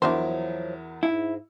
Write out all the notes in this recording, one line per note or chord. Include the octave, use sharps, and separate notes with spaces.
E2 F3 F#3 D4 E4 F#4 A#4 C5
G#2 E4